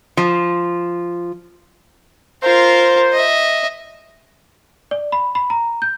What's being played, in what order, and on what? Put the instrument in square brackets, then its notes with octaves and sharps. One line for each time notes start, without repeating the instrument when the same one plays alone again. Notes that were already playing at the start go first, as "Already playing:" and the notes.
[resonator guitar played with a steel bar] F3
[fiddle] F4 A#4 [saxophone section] C5
[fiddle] D#5 E5
[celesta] D5
B5
B5
A#5
G6